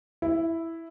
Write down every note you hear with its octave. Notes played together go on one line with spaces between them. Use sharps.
E4